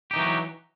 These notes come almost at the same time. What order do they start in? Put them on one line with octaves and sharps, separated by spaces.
G4 D#4 E3 F#3